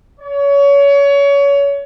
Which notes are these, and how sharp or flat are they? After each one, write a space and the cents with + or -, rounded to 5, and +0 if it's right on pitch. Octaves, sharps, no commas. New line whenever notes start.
C#5 +25